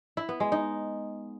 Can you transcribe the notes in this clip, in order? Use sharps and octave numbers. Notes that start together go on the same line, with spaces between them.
E4
B3
G#3
D#4